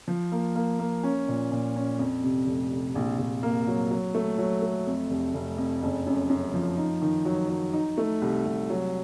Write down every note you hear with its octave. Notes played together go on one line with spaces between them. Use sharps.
F3
A#3
A#3
A#3
C#4
A#2
A#2
C#4
F2
C3
F1
C3
A#1
A#1
A#3
F#3
F#3
A3
F#3
A3
F2
F1
F1
F2
F#1
F#2
F#2
F3
D#4
D#3
F#3
F#3
D#4
A3
C2
C2
F#3